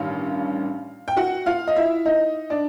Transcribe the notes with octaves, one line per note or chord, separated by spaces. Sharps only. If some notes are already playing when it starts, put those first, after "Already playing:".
Already playing: A1 G2 D#3 F5
G5
F#4 F#5
F4 F5
D#5
E4 E5
D#4 D#5
D4 D5